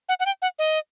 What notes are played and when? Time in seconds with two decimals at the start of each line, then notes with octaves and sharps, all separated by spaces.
0.09 F#5
0.20 F#5
0.26 G5
0.42 F#5
0.59 D#5